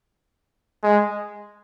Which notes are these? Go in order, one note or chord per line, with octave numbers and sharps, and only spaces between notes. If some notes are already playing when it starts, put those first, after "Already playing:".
G#3